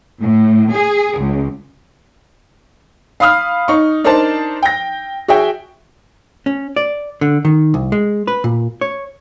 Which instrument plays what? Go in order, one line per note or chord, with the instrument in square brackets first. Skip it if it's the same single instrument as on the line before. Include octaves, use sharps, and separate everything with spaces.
[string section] A2
G#4
C#2
[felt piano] F5 B5 D#6 F6
D#4 C#6
D4 D#4 A#4 C5 D5 A5
G5 A#6
F#4 G#4 E5 G5
[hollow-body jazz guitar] C#4
D5
D3
D#3
C2
G#3
B4
A#2
C#5